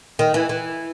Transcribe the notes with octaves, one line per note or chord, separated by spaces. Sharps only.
D#3
E3
E3